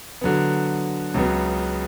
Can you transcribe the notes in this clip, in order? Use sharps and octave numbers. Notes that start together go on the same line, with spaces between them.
D3 F#3 B3
C#2 C#3 F#3 B3